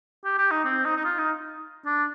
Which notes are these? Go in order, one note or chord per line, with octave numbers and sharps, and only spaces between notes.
G4
G4
D#4
C4
D#4
D#4
F4
D#4
D4